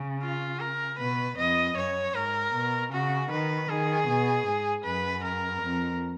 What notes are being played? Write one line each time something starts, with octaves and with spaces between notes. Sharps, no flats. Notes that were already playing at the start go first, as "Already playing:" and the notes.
Already playing: C#3
F4
A#4
B2 B4
F2 D#5
F#2 C#5
G#2 A#4
B2
C#3 F#4
D#3 B4
D#3 G#4
B2
G#2
F#2 B4
A#4
F2